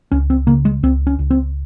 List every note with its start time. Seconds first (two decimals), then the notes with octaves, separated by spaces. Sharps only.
0.12 C#2 C#4
0.30 C4
0.47 C#3 A#3
0.65 G#3
0.83 C#2 C4
1.07 C#4
1.19 C#2
1.31 C4